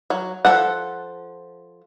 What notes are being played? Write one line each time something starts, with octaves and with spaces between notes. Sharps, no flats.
F#3
F3 C#4 A4 F#5